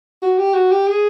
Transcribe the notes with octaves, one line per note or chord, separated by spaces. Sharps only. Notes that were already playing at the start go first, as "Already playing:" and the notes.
F#4
G4
F#4
G4
G#4